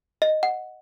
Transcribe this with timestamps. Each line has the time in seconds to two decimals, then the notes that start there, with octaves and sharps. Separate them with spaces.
0.22 D#5
0.43 F#5